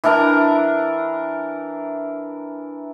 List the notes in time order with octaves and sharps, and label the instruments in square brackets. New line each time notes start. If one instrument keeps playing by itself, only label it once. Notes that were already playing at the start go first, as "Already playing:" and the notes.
[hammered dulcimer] E3 D4 A#4 A#5